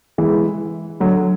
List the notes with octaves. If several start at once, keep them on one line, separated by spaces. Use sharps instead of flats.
E3 G#3
D3 F#3